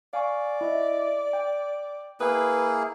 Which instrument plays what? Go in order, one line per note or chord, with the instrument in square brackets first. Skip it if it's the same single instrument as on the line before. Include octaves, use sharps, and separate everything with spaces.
[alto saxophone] D5 [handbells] F5 G#5 C#6
[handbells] E4 D#5 E5
G5
[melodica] A#3 E4 G#4 [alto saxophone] B4 [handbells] G5 D#6